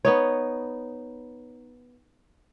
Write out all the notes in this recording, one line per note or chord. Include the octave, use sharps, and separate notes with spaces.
B3 D#4 C#5